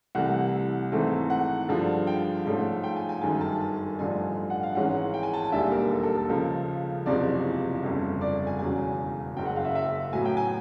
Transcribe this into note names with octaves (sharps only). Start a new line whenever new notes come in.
C2 C3 E3 A3 F#5
G#1 G#2 E3 A3 C4
F#5
G2 D3 F3 G#3
G5
G#2 F3 A3 C#4
G5
G#5
G#5
G1 F#2 D#3 G#3 G#5
A5
G#5
A1 G2 D3 F3 G#5
F#5
F5
G#1 G#2 E3 G#3 C#4 F#5
G5
G#5
A5
G#5
E1 D#2 D3 G3 E5
A#4
A4
A4
A4
C#2 C#3 F3 A4
F#1 E2 C3 F3 G#3 D5
G1 F2 C#3
D5
G#5
E1 E2 C#3 F#3 G#5
F#1 F#2 C#3 G5
F#5
F5
E5
E5
A2 F#3 B3 G#5
G5
G#5